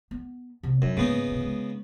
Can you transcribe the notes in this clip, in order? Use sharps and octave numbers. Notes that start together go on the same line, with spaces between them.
B3
D2 C3
F#2 D4 D#4
G#2 C#3 A#3 B3 D#4
G1 B2
D#3 G#3